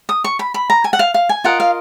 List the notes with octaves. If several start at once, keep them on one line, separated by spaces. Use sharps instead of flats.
D#6
C#6
B5
B5
A#5
G#5
F#5
F5
F5
G#5
F4 A#4 D#5 F#5
F5